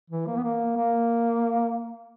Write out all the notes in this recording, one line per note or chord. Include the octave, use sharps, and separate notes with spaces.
E3
A#3
B3
A#3
A#3